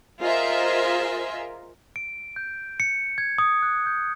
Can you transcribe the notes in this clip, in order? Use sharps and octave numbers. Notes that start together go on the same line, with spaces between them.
F4 G#4 A#4 C5 D#5 E5
D7
G6
C#7
G#6
D#6
F#6
G6